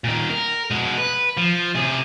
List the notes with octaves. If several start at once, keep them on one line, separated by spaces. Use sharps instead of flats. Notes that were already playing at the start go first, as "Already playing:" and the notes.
A#2 D#3
A#4
B2 G#3
B4
F3
C3 G#4